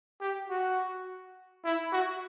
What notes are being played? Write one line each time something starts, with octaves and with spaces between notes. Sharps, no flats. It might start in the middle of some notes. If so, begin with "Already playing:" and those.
G4
F#4
E4
F#4